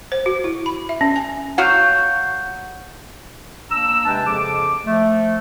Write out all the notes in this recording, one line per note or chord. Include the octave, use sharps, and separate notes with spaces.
C5
F#4
E4
B5
E5
C#4
G#5
F#3 F#4 F5 F#5 C#6 G6
A#3 D4 A#5 E6
C3 G#3 D4 B4 G5 A5
F2 C#3 F3 D6
F3 A3